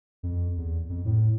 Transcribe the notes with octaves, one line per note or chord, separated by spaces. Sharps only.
F2
E2
F2
A2